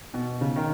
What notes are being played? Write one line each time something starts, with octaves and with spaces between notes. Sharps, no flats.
B2
C#3
D#3